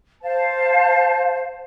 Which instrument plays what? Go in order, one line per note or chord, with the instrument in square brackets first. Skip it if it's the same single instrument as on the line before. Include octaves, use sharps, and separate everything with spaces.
[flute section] C5 F5 A5